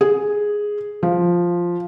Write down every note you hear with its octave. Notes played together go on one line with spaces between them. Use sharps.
G#4
F3